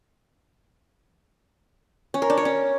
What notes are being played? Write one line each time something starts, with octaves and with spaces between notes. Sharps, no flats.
C#4
A#4
D4
C#5
C#4